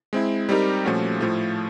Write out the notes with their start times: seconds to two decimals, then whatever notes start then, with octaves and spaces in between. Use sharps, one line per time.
0.13 G#3 C4 E4
0.49 G3 C4 D#4 G4 A#4
0.85 A#2 F3 A3 C#4 F#4
1.21 A2 F3 A3